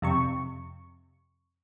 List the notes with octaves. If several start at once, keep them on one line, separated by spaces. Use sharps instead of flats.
F2 C3 C#6